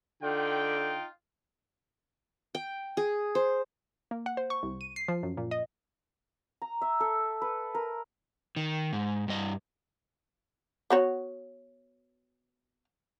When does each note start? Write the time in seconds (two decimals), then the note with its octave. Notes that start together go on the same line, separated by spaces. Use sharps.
0.23 D3 D#4 F4 G5
2.55 G5
2.97 G#4
3.35 C5
4.11 A#3
4.26 F#5
4.37 C5
4.50 C#6
4.63 C2
4.81 D#7
4.96 C7
5.08 F3
5.23 F#2
5.37 A#2
5.51 D#5
6.62 A#5
6.81 E5
7.00 A4
7.42 B4
7.75 A#4
8.56 D#3
8.93 G#2
9.28 G2 D#5
10.90 B3 F#4 C#5